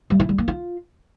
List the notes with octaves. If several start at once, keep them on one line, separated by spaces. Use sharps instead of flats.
G3
E4
G3
A#3
F4